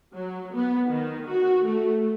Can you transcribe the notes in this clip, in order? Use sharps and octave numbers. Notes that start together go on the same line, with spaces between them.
F#3
B3
D#3
F#4
A3